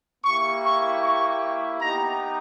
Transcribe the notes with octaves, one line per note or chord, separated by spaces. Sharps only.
A#3 E4 G4 C#6
C#6
C#6
B3 D#4 G4 A#5